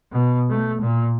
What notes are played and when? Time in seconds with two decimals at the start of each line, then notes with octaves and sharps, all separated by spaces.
0.12 B2
0.50 A3
0.81 A#2